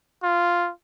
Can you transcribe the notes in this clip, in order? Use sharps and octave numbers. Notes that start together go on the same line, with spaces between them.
F4